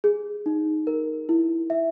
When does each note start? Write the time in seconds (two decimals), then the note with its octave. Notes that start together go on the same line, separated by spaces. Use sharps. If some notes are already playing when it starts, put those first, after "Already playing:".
0.04 G#4
0.46 D#4
0.87 A#4
1.29 E4
1.70 E5